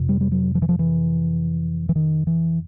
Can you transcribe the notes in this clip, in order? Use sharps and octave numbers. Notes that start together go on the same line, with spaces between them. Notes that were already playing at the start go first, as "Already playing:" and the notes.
Already playing: F2 C3
G3
G3
F#3
F3
E3
F3
E3
E3
D#3
E3